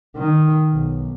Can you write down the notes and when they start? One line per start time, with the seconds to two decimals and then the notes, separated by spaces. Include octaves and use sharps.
0.17 D#3
0.73 B1